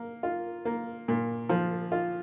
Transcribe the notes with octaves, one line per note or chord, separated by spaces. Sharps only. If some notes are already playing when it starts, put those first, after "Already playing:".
Already playing: A#3
F4
A#3
A#2
F3
F4